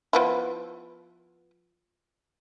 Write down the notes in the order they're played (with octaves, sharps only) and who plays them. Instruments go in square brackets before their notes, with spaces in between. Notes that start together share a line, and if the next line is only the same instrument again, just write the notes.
[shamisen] F3 B3 E4